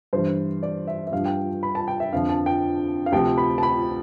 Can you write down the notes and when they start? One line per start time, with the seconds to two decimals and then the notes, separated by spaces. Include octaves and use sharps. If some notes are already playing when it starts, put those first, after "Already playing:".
0.13 G2 E3 C5
0.63 D5
0.87 E5
1.07 E5
1.12 G2 F3 F5
1.25 G5
1.63 B5
1.75 A5
1.88 G5
2.00 E5
2.13 F2 D3 F3 F5
2.29 A5
2.46 G5
3.06 F5
3.12 D2 C3 F3 G5
3.38 B5
3.58 A5
3.63 B5